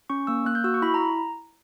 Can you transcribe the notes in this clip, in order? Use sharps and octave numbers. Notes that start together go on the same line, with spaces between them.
C#4 C#6
A#3 E6
A#3 F#6
G6
F#4 E6
C#6
E4 B5
A#5